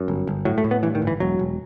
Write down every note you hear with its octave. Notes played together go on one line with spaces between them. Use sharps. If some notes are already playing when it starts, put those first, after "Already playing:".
Already playing: F#2
G1
G1
A2 F#3
A3
A2
B3
G2 E3
D#3
G1
E3
E1 F#3
E1